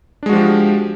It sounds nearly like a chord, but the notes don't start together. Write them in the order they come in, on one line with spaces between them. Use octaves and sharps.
D4 G#3 F#4 F3 G4